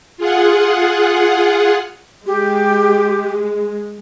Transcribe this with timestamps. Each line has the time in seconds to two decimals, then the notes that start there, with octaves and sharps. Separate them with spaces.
0.17 F4 G#4 F#5
2.27 G#3 G4